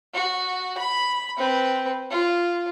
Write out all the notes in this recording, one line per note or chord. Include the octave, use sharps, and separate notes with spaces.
F#4
B5
C4 B4
F4